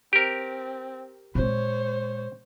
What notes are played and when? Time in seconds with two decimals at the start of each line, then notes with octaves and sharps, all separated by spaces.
0.13 C4 G4 A#4
1.35 A#2 G#3 C5 C#5